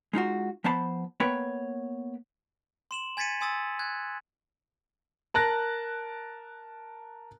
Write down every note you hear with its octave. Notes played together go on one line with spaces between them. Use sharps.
G#3 D#4 F4 F#4
F3 B3 C5 A5 B5
A#3 B3 B4 C#5 G5 B5
C6 E7 F#7
G#5 G#6 A6 B6 C#7 D#7
G#5 C6 D#6 E6 A6
F#6 G#6
A#4 A5 F#6 A#6